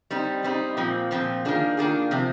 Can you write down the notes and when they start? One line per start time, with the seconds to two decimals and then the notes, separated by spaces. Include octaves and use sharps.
0.11 G3 C4 D#4
0.44 G3 C4 D#4
0.77 A#2 F3 C4
1.11 A#2 F3 C4
1.45 D#3 A#3 D4 F4 G#4
1.77 D#3 A#3 D4 F4 G#4
2.11 C3 F3 C4